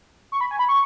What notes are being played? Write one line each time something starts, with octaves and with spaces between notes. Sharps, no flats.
C#6
B5
G#5
B5
C#6